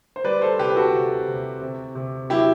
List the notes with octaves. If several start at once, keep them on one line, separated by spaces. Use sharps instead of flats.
C5
G3 B4 D5
A4 C5
C3 G4 B4
B4
F#4 A4
C3
C3
C3
C3
F#3 E4 G4